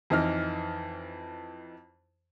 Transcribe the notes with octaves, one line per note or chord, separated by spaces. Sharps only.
F2 E3 D#4 F6